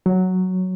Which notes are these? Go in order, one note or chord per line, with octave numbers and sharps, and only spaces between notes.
F#3